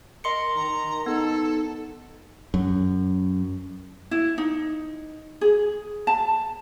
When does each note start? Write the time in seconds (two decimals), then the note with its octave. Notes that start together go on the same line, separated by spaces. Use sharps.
0.24 A#4 D#5 C6 C#7
0.56 D#3 A#5
1.06 B3 D#4 A4
2.54 F#2
4.11 E4
4.38 D#4
5.41 G#4
6.07 A5